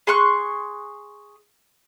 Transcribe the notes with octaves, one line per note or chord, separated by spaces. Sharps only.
G#4 C6 C#6 F#6